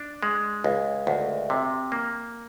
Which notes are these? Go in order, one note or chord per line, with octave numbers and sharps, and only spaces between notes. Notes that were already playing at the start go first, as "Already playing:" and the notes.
Already playing: D4
G#3
C#2
D2
C3
A#3